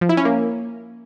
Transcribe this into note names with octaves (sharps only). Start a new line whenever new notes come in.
F3
E4
C#4
A#3